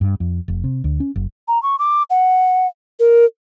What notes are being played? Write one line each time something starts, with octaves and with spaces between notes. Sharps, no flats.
G2
F2
F1
C3
D2
C#4
F#1
A#5
C#6
D6
F#5
A#4